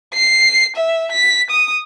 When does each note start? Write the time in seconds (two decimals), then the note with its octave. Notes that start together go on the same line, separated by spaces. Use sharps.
0.13 C7
0.76 E5
1.11 B6
1.50 D#6